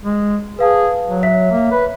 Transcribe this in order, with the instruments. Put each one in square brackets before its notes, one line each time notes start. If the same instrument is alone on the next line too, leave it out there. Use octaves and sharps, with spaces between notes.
[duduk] G#3
[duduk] G#4 [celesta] B4 F5 A5
[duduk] F#3
[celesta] C#5 E5 B6
[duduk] A#3
B4